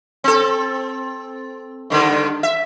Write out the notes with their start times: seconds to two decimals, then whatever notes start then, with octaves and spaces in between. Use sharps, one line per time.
0.24 C4 A4
1.90 G2 D3 D#3
2.43 E5